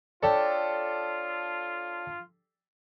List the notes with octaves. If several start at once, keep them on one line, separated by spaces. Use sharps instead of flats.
D4 F4 G4 A4 C#5 D5